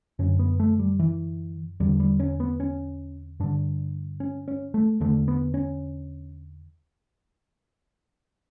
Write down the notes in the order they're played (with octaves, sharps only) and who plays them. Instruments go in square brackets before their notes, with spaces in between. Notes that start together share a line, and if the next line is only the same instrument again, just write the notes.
[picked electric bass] F#2 D3 C#4
B3
A3
G3
E3
E2 D3 G3
G3
C#4
B3
C#4
G2 D3 D4
C#4
C#4
A3
E2 D3 A3
B3
C#4